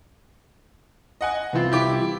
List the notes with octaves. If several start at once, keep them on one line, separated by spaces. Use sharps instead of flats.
D#5 F#5 G#5
C2 E3 B3 C4 F4
E4 G4 D6